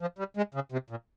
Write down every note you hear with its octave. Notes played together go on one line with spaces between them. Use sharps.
F3
G3
G#3
C#3
C3
A#2